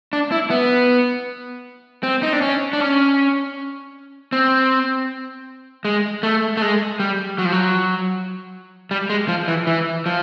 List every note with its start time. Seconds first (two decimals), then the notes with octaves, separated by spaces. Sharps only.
0.13 D4
0.32 E4
0.50 B3
2.03 C4
2.23 D#4
2.33 D4
2.41 C#4
2.73 D4
2.80 C#4
4.33 C4
5.85 G#3
6.23 A3
6.57 A3
6.62 G#3
7.00 G3
7.38 F#3
7.45 F3
7.52 F#3
8.91 G3
9.10 G#3
9.28 F3
9.48 E3
9.67 E3
10.06 F3